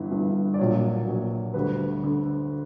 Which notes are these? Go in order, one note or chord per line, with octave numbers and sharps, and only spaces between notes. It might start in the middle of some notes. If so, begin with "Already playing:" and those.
Already playing: G1 G2 E3
G1 G2 E3
D5
A#1 A#2 F#3 C#5
A#1 A#2 F#3
D2 D3 G3 B4
D3